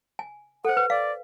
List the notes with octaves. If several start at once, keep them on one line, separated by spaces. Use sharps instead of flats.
G#5
A4 C5 F#5
B4
D5 F5